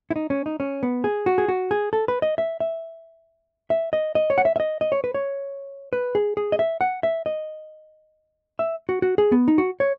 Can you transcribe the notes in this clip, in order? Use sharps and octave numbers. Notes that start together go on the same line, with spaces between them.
E4
D#4
C#4
D#4
C#4
B3
G#4
F#4
G#4
F#4
G#4
A4
B4
D#5
E5
E5
E5
D#5
D#5
C#5
F#5
E5
E5
D#5
D#5
C#5
B4
C#5
B4
G#4
G#4
D#5
E5
F#5
E5
D#5
E5
F#4
F#4
G#4
B3
D#4
F#4
C#5